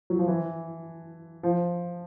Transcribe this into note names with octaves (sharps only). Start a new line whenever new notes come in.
F#3
F3
E3
F3